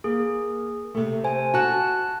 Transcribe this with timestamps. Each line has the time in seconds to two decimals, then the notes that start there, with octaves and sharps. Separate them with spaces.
0.04 A#3 G#4
0.95 C3 A3
1.24 C5 G#5
1.54 F#4 A5 F#6